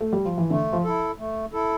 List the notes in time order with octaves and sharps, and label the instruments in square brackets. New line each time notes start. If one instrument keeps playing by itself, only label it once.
[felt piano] A3
G3
F3
E3
[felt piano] D3 [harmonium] A3
[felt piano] F3
[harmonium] E4 A4
A3
E4 A4